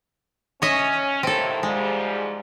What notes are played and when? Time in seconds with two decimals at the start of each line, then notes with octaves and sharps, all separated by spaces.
0.62 C#4 C#5 D#5 E5
1.23 D#2 A2 C4 A4
1.63 G#2 F3 G3 G#3